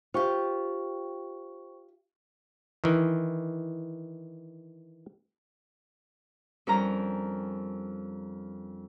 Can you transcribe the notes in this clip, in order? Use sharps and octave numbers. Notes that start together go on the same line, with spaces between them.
F4 G4 C5 G5 C#6
D#3 E3
F2 G3 C#4 D4 A#4 A#5